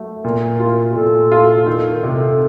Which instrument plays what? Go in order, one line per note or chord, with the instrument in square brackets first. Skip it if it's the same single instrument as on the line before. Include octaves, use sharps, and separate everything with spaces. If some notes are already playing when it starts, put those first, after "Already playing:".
Already playing: [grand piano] F#3 A3
[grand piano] A#2 [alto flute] A#4
[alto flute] A#4
[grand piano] F4
[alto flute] F#4
[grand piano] A#2 [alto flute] A4
[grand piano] F4
[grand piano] D#3 [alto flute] A4
[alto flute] A#4
[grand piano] C3
[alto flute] A4